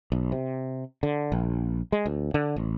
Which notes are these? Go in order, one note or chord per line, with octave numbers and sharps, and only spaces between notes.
B1
C3
D3
A#1
G#3
D2
D3
A1